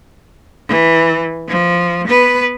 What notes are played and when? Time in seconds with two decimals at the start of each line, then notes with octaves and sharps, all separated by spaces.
0.68 E3
1.49 F3
2.08 B3 B4